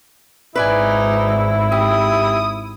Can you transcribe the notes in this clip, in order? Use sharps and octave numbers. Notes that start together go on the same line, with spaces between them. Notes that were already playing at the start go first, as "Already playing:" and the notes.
G#1 G#2 D#4 E4 B4 D5 G#5
G4 D#6